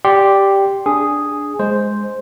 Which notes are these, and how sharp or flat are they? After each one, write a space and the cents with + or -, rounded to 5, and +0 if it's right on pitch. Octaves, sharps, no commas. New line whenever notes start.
G4 +0 D5 +0 C6 +0
D4 +0 G#4 +0
G#3 +0 C5 +0